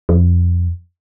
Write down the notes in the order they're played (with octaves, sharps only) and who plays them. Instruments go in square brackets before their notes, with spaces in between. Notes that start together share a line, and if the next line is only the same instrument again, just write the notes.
[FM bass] F2